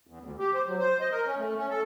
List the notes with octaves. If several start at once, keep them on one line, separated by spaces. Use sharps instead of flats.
E2
D2
G4
C5
F#3
C5
D#5
A#4
C#4
A3
C#4
A4